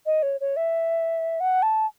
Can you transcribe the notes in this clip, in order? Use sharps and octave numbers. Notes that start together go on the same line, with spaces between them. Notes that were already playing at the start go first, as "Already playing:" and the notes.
D#5
C#5
C#5
E5
F#5
A5